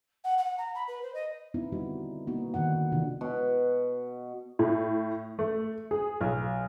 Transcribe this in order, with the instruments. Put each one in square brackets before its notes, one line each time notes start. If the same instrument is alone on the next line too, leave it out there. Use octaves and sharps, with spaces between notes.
[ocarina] F#5
F#5
A#5
B5
B4
C5
D#5
[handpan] B3 C4 D#4 E4
D3 G3 D#4 F#4
A#3 B3 D#4 F#4
D3 D#3 F#4 F#5
C3 E3 D4 F4 F#4
[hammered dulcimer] B2
[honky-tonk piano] A2
A3
G#4
B1